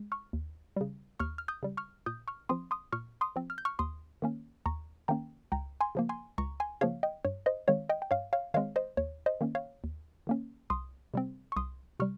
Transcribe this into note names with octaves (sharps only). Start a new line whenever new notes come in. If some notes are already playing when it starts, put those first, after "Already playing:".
Already playing: G#3
C#6 F6
D#2
C#3 G3
D#2 C#6 F6
F6
D#6 G6
C#3 G3
C#6 F6
A#2 D#6 G6
C#6 F6
F3 C4 C6 D#6
C6 D#6
A#2 C#6 F6
C6 D#6
F3 C4
F6
G6
C#6 F6
D#2 C6 D#6
D#3 A#3 C#4
D#2 A#5 C#6
D#3 A#3 C#4 G5 A#5
C#2 G5 A#5
G#5 C6
C#3 F3 A#3
G#5 C6
C#2 A#5 C#6
G#5 C6
C#3 F3 A#3 C#5 F5
D#5 G5
G2 C#5
C5 D#5
D#3 G#3 C4 C#5 F5
D#5 G5
G5
G2 C#5 F5
C#5 F5
D#3 G#3 C4 C#5 F5
C5 D#5
D#2 C#5
C5 D#5
D#3 A#3 C#4
C#5 F5
D#2
D#3 A#3 C#4
C2 C6 D#6
C3 G3 C4
C#6
C2 C6 D#6
C3 G3 C#6 F6